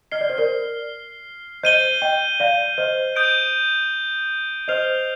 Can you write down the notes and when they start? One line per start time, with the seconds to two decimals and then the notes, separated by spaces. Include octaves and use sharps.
0.12 D#5 F6 C7 G7
0.21 D5
0.30 C5
0.38 A#4 D5
1.63 C5 D#5 G6 C7 D#7 G7
2.02 D#5 G5
2.40 D5 F5
2.78 C5 D#5
3.16 D#6 G6 D7
4.68 C5 D#5 F6 C7 F7